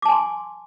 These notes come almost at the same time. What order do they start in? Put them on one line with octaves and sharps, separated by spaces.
D6 A5 G#5 C6